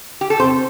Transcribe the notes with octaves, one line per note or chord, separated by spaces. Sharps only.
G4
A4
C3 C5